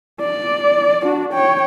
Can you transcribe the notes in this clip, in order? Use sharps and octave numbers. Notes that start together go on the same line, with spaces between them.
D5
D4 F#4
C#5 G5